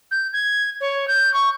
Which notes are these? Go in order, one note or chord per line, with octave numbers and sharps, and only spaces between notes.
G6
G#6
C#5
G6
C#6